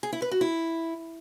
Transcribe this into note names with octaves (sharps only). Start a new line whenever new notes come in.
G#4
E4
B4
F#4
E4